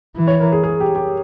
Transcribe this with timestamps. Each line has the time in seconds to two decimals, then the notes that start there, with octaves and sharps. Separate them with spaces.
0.16 E3
0.27 C#5
0.40 A#4
0.52 G#4
0.64 G#4
0.80 G4
0.96 G4